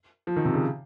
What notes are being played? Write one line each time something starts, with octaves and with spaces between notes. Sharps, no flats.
F3
D#3
C3
C#3